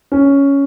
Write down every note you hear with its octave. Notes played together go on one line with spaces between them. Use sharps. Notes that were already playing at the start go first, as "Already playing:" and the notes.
C#4